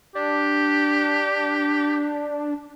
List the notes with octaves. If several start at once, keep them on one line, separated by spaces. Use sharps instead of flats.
D4 G4